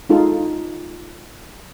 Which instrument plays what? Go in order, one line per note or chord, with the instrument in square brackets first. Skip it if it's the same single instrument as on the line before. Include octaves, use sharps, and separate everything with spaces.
[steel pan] G#3 D#4 F4 A4